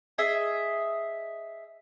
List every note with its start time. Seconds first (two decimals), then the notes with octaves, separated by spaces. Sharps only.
0.18 G#4 D#5 E5